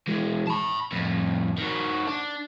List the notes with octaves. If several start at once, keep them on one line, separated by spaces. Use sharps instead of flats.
E3 G#3
A5 B5
F2 A2
D#3 F#4
D4